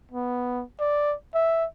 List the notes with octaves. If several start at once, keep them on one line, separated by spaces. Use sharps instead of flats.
B3
D5
E5